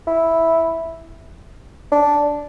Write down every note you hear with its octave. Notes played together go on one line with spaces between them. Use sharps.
E4
D4